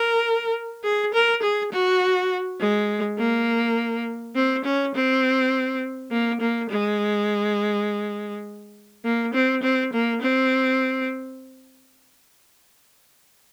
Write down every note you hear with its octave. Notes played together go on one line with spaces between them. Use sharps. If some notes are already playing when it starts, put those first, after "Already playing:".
Already playing: A#4
G#4
A#4
G#4
F#4
G#3
A#3
C4
C#4
C4
A#3
A#3
G#3
A#3
C4
C4
A#3
C4